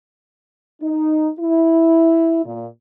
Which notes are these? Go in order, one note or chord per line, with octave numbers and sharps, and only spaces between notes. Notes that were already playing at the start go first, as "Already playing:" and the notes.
D#4
E4
A#2